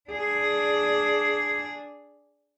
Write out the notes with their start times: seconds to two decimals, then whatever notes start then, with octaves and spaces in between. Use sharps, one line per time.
0.10 D4 G#4